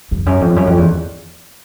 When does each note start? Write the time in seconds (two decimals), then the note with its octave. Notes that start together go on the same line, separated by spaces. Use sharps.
0.11 F2
0.26 F#2
0.41 F2
0.56 F#2
0.67 F2
0.78 E2